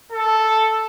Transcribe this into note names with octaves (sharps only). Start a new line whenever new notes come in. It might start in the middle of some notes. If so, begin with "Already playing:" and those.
A4